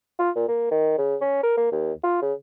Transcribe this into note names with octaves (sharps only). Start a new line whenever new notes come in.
F4
A#2
A#3
D#3
C#3
C#4
A#4
A#3
D#2
F4
C#3